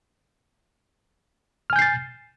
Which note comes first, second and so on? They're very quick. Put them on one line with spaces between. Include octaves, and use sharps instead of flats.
F6 G#5 G6 C7 A6